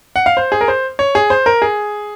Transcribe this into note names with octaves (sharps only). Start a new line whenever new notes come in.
F#5
F5
C5
G#4
A#4
C5
C#5
G#4
C5
A#4
G#4